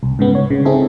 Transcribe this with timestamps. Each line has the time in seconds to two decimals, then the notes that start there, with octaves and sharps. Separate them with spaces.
0.03 C2
0.19 G#2 C#3 B3
0.35 C#5
0.50 C#3
0.65 C4 D#4 E4 G#4 A4